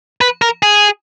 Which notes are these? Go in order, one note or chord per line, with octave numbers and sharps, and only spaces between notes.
B4
A#4
G#4